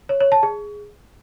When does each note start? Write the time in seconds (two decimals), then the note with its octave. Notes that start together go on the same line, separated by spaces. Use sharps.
0.09 C#5
0.20 C#5
0.32 A5
0.43 G#4